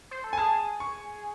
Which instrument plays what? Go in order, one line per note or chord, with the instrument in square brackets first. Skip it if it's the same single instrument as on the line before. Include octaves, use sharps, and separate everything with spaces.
[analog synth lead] C5
A4
[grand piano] G#5
[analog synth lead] G#4 [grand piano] A5
[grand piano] C#6